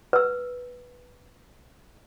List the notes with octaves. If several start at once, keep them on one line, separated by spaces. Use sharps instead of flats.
B4 E6